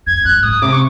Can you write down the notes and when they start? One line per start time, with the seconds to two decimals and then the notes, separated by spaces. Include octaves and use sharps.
0.07 F2 G#6
0.25 F#2 F#6
0.43 G#2 D#6
0.62 C3 D6
0.73 C#6